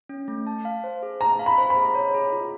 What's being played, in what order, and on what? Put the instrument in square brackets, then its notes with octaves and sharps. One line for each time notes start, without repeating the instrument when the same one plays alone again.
[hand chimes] C#4
A3
A5
F5
C5
G#4
[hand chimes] A5 [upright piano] A#5
[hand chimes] F5
[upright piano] B5
[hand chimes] C5
[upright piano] B5
[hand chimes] G#4
C#5
G#4
F4